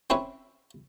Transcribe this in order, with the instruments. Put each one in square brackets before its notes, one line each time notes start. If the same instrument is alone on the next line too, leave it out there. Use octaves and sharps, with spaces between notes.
[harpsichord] C4 C#4 E4 B4